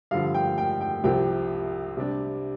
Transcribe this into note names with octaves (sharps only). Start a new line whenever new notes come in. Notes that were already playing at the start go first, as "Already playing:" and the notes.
G2 D3 F3 F5
G5
G5
G5
C2 C3 F3 G5
C3 G3 D4